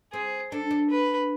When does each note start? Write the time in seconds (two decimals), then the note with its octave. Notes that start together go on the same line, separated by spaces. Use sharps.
0.13 C4 G#4
0.52 D4 A4
0.71 D4
0.90 B4